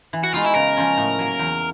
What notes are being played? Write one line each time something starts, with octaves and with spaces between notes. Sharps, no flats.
E3
F#4
G#3 B3 D#4 F4 F#4
E4
C#3 A#4
F3 G#3 C#4 F4
A2
F#3 A#3
E2